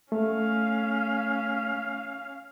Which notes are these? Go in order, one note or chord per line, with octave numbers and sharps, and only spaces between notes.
A3 C#4 F5